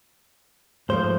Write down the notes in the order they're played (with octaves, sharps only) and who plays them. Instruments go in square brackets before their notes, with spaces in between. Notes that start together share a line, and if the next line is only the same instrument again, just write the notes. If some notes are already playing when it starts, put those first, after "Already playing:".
[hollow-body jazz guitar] G#2 F3 A3 C5